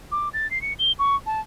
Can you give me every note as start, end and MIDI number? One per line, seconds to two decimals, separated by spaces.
0.12 0.29 86
0.34 0.50 93
0.51 0.61 96
0.62 0.73 97
0.79 0.92 103
0.99 1.16 85
1.26 1.40 81